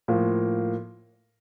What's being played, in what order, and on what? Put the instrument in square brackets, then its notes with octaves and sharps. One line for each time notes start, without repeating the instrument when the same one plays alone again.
[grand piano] A2 F3 A#3